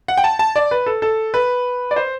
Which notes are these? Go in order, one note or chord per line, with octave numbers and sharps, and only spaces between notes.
F#5
G5
A5
A5
D5
B4
A4
A4
B4
D5
C5